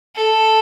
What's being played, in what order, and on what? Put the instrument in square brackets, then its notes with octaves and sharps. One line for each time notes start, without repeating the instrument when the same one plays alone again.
[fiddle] A4